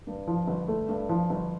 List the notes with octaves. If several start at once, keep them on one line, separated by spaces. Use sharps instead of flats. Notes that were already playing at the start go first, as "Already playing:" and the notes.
G2
F3
G1
A3
G2
F3
G1